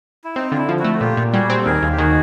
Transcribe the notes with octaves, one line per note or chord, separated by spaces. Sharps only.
E4
C4 D#4
D3 F4
E4
F3
A3 E4 F#4
F#4
A#2 F4 G4
A#2
G3 F#4 G#4
C4
A4
D#2 G#4 A#4
D#2
G4
D#3 F#4 G#4